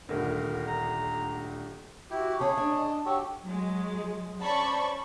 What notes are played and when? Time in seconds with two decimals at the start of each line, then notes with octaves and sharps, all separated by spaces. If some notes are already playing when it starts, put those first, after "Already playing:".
0.09 D#1 D2 A#4
0.68 A#5
2.10 E4 F#4 G4
2.39 C#3 C#4 G#4 C#5 A5
2.57 D4 G#5
2.71 D#5
3.06 F#4 G4 A4 C#5
3.42 F#3 G#3
4.42 C#4 C5 D5 A5 B5 C#6